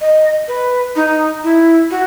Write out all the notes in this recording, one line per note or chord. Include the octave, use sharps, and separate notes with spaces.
D#5
B4
D#4
E4
F#4